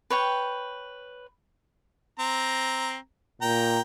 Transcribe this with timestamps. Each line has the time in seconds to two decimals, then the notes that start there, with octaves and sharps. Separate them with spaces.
0.10 B4 C#5 G5
2.19 C4 A#5
3.42 A#2 G5 A#5